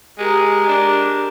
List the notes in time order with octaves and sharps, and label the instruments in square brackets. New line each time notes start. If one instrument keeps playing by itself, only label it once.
[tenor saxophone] G#3 [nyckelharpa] G4 A#4
[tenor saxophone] D4